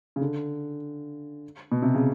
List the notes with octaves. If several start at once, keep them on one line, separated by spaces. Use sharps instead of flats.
C#3
D3
B2
C3
C#3